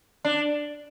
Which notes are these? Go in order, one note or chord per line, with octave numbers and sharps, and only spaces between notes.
D4